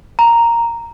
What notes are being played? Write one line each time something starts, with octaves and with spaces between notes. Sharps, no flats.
A#5